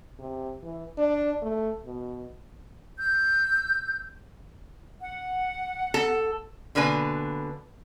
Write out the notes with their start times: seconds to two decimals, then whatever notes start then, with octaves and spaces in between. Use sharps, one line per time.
0.19 C3
0.63 E3
0.97 D4
1.42 A3
1.85 B2
2.97 E6 G6
5.01 F#5
5.94 A4
6.75 B2 D3 A#3 B4 G#5